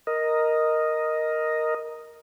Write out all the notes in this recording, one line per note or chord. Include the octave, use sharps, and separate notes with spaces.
A#4 D#5